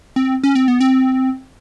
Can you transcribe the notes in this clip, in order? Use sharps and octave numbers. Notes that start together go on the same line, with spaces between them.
C4
C#4
C4
B3
C4